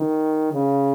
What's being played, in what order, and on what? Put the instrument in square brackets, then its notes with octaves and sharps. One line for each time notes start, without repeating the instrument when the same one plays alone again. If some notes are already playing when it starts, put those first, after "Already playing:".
Already playing: [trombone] D#3
C#3